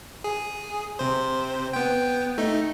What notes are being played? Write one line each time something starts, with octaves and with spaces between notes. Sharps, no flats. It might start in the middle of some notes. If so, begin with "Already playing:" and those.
G#4
C3 C5
B3 G5
A3 D#4